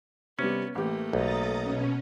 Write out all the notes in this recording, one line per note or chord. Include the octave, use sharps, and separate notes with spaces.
C3 G3 B3 C#4
A1 A3 A#3 G4
B1 A#5 D#6 A6
B2 C#4